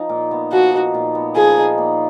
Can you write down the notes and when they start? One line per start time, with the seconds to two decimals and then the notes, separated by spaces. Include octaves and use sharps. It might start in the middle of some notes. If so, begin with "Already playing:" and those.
Already playing: F3 D#4
0.09 A#2
0.31 B3
0.52 F3 F#4
0.74 D#4
0.94 A#2
1.15 B3
1.36 F3 G#4
1.58 D#4
1.78 A#2